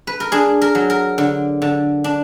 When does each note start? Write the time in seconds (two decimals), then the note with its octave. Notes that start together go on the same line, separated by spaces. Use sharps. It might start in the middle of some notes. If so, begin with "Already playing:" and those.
0.07 B4
0.20 A#4
0.32 D4 G#4
0.61 A#4
0.75 F#3
0.90 A#4
1.18 D3
1.62 D3
2.04 D4